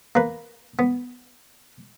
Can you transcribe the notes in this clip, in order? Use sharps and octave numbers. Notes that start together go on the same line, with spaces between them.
A#3 B4
B3